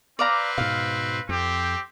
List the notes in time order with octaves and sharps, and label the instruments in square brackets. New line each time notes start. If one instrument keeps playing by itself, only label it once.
[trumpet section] C4 B4 [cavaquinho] D5 F5 A#5
[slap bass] G#2 B2 [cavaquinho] F5
[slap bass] F2 [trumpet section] C4 G4